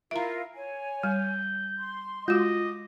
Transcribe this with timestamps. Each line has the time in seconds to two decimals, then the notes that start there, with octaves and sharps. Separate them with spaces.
0.11 E4 F4 A#4 E5 A#5
0.56 C#5 G#5
1.03 G3 G6
1.78 C6
2.28 G#3 F4 F#4 D#5 D6